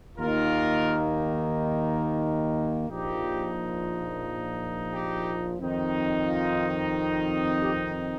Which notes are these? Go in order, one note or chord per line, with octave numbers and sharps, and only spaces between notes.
D#2 D#3 A#3 D#4 F4 A#4
A#1 A#2 F3 D#4 G4
G4
F2 D#3 C4 D#4
F4
G4